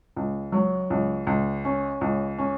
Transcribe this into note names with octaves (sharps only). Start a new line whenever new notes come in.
C#2
F#3
C#2
C#2
C#4
C#2
C#4